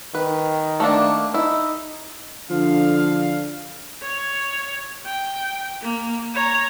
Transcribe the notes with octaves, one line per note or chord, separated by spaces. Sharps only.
D#3 B4
A3 A#3 D4
D#4 E4
D3 F3 F5
C#5
G5
A#3
C#5 A#5